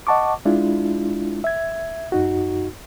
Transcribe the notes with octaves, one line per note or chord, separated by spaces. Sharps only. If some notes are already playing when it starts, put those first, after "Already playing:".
D#5 F#5 A5 C#6 D6
G#3 D4 E4 F4
E5 G#6
F#2 D#4 F#4